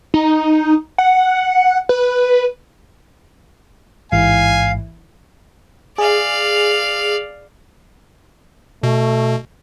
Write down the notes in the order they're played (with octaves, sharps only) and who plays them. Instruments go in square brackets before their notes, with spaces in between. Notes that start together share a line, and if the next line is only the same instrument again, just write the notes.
[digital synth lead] D#4
F#5
B4
[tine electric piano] A1 G#2 [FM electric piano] E3 E4 [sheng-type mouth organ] F5 [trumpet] G#5
[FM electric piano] G#4 [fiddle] D5 F5
[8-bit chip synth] B2 [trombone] A3